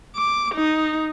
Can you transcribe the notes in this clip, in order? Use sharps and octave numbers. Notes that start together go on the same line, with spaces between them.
D6
D#4